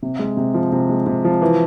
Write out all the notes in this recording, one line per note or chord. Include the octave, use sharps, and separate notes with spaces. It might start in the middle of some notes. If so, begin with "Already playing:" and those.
C3
G#3
C3
F3
C3
G#3
C3
F3
E3